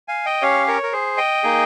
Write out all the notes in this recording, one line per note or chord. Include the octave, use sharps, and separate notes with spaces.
F5 G#5
D#5 G5
C#4 G4 C#5 F5
A#4 C#5
A#4
G#4 C5
D#5 G5
A#3 D#4 G#4